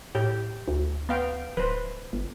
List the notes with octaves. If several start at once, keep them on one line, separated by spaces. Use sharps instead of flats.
A2 G4
D2
B3 F5 G5
D1 B4 C5
G1